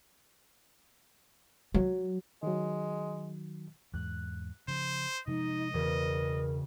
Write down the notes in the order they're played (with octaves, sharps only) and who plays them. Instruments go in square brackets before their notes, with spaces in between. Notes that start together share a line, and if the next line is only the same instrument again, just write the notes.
[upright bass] F#3
[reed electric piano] D#3 F#3 [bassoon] G#3
[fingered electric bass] E2 G#2 [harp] F#6
[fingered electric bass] C#3 F3 [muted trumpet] C5
[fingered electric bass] C3 F3 G#3 [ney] D#4 [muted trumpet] D#5
[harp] E1 C#3 [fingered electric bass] E2 E3 [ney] A#4